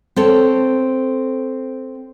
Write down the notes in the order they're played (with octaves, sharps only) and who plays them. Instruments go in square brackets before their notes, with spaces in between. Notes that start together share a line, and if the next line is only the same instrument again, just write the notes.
[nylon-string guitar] C4 A4 C#5